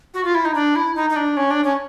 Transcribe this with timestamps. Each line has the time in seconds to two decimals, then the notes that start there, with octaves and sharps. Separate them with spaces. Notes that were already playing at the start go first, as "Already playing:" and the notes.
0.14 F#4
0.24 F4
0.35 E4
0.45 D#4
0.55 D4
0.76 E4
0.96 D#4
1.10 D#4
1.16 D4
1.37 C#4
1.50 D4
1.64 C#4